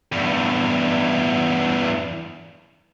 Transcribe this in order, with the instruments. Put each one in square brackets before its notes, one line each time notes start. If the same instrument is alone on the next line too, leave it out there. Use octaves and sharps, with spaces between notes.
[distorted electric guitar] E2 G2